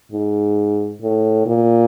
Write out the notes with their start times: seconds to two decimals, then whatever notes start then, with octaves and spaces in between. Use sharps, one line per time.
0.12 G#2
1.02 A2
1.46 A#2